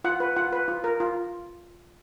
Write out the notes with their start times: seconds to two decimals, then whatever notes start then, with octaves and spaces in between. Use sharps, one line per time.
0.04 F4 F#5
0.20 B4
0.36 F4 F#5
0.53 B4
0.68 F4
0.84 A#4
1.00 F4